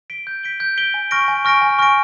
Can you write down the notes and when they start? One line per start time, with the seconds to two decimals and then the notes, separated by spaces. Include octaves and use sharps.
0.10 B6 D7 G7
0.27 G6
0.44 B6 D7 G7
0.60 G6
0.77 B6 D7 G7
0.94 G#5
1.11 C#6 F6 A#6 D7
1.28 G#5
1.45 C#6 F6 A#6 D7
1.62 G#5
1.79 C#6 F6 A#6 D7